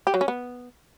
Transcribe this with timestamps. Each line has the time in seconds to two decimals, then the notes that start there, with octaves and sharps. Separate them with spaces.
0.07 G4
0.14 F#3
0.21 C#4
0.28 B3